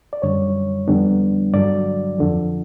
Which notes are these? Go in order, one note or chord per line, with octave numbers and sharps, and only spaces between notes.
D5
F#2 D3 G3 C#5
F2 D3 G3 B3 D4
G2 D3 F#3 D5
F2 D3 F3